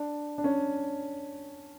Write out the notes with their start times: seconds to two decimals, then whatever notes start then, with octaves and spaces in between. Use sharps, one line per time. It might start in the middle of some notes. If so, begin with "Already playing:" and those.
Already playing: D4
0.38 D4
0.44 C#4